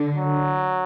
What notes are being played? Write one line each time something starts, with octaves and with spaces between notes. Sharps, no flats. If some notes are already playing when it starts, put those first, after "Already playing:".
Already playing: D3
F#3